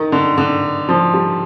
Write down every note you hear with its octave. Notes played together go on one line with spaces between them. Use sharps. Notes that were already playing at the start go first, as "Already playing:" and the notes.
Already playing: D#3
D3
D3
F3
G3